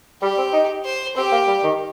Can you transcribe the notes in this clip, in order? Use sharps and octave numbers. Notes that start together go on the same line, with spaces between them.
G3 G4
C4
D#4
C5
C4 G4
A#3
G3
D#3